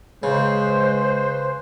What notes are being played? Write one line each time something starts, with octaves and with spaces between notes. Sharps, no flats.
C#3 G#3 B4 C5